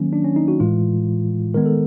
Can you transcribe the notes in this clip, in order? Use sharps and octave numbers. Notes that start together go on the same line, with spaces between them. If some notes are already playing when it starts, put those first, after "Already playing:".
Already playing: D#3 F#3 A#3 C#4
D4
C#4
D#4
F#4
A2 E3 G#3 F4
D#3 G#3 B3 A#4
A4